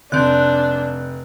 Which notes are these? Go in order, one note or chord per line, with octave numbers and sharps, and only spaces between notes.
F1 C4 D4 F#6